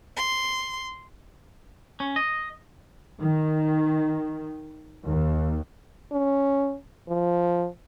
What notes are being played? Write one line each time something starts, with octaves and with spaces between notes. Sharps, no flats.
C6
C#4
D#5
D#3
D#2
C#4
F3